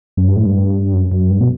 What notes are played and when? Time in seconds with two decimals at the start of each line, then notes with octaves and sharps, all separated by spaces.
0.17 F#2
0.28 G2
0.36 A2
0.46 G2
0.93 F#2
1.12 F#2
1.30 G2
1.41 B2